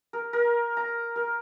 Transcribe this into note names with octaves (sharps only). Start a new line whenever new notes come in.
A#4
A#4
A#5
A#4